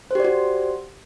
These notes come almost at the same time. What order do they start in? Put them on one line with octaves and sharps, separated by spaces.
C5 G4 D5 F#4